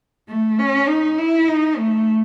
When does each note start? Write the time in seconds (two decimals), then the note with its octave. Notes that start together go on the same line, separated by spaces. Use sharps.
0.29 A3
0.59 C#4
0.88 D#4
1.18 E4
1.48 D#4
1.78 A3